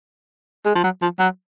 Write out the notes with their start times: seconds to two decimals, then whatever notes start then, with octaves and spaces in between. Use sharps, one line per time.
0.66 G#3
0.75 F3
0.84 F#3
1.02 F3
1.19 F#3